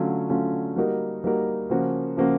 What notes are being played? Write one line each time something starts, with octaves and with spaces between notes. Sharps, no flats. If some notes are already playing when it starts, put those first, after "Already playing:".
Already playing: D3 F#3 A3 C#4 F4
D3 F#3 A3 C#4 F4
G3 A#3 D#4 F#4 A#4
G3 A#3 D#4 F#4 A#4
C#3 F3 A#3 C#4 F#4
C#3 F3 A#3 C#4 F#4